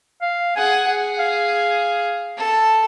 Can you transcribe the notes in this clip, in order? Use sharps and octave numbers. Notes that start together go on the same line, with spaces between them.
F5
G#4 F#5 G#5
G#4 F#5
F5
A4